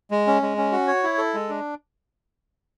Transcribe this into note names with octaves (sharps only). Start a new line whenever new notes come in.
G#3
C#4
G#3
C#4
F#4
C#5
E4
A4
G#3
D4